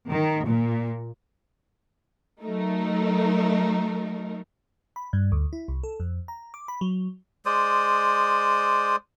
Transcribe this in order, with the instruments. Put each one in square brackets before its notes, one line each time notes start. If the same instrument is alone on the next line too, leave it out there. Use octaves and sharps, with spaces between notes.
[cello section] D#3
A#2
[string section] F#3 A3 D#4 A#4
[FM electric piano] B5
G2
D2
E4
C2
A4
F2
A#5
D6
B5
F#3
[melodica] G#3 C5 D5 D#6